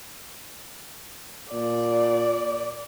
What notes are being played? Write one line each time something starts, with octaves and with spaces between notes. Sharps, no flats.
A#2 D5